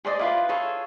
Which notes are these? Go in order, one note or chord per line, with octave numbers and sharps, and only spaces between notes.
G#4 C5 D5 D#5
E4 F4 B4
F4 G#4 A4 C#5